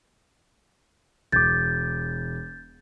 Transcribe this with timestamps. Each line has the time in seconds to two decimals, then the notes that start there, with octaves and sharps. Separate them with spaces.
1.32 E1 D6 G6 A6